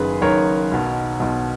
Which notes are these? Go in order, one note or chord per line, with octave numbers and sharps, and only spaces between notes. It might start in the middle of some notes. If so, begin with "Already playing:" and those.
Already playing: F#1 F#2 D#3 G#4 B4
F#1 F#2 D#3 A#4 C#5
B1 B2
B1 B2